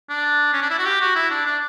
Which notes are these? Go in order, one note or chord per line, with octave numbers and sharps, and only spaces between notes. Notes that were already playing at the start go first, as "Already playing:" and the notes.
D4
C#4
D4
E4
F#4
G4
F#4
E4
D4
D4